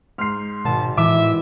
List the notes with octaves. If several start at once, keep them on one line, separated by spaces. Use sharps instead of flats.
G#2 F6 C7
G#1 B2 A5
A2 E3 E5 D6